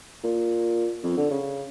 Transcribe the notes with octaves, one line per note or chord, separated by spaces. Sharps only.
A#2
F2
D3
C#3